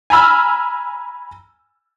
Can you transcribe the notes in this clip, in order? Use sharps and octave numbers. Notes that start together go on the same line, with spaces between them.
G#5 A#5 B5 E6 F6